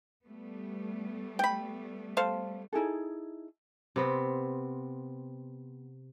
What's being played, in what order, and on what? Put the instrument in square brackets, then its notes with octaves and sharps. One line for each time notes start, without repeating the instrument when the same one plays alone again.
[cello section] G3 A3 B3
[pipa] G5 B5
A4 C5 F5
[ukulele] D#4 E4 G#4 A4
[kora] C3 B3 C4